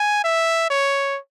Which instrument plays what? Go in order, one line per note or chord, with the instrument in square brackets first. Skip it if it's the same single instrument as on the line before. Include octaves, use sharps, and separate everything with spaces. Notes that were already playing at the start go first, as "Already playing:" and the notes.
Already playing: [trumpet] G#5
E5
C#5